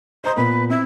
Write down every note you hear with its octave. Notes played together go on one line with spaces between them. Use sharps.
C5 D#5 A#5 D#6
A#2 B3 B4
C4 E4